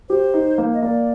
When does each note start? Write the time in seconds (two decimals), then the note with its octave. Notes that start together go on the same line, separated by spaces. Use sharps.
0.09 G4 C5
0.34 D#4
0.58 A#3
0.73 D#5
0.82 A#3 D5